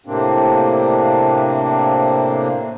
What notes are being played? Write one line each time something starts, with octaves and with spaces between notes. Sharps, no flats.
A2 C3 A#3 C4 D4